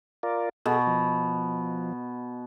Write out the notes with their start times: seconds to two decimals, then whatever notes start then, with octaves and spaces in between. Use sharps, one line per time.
0.23 F4 A#4 D5
0.66 B2 G#4 A4
0.87 F3